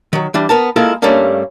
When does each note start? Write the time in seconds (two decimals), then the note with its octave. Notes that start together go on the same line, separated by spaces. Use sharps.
0.13 D#3 F#3
0.34 E3 G3 D4
0.49 B3 A#4 A5
0.76 G#3 A#3 E4 F4 A4 A#4
1.02 G2 G3 A3 A#3 C#4 D4